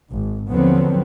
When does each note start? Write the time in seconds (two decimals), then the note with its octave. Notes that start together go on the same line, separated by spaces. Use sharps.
0.11 G#1
0.50 D#2 D3 F3 F#3 B3 C4